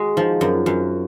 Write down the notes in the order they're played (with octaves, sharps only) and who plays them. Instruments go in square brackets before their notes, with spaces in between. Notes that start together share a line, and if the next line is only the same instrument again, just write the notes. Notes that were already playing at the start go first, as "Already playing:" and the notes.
Already playing: [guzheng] G#3 [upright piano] F#4 G#4
[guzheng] F3 [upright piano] D#4
[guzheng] F#2
[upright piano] F4
[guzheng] F#2 [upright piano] F#4
[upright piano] F4